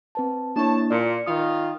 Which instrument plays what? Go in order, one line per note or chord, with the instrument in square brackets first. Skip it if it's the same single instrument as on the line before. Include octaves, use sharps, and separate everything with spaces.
[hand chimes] C4 B4 A5
[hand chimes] A#3 D4 E4 [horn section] C#5 A5
[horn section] A#2 [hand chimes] D5 C#7
[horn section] D#3 F4 [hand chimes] D#6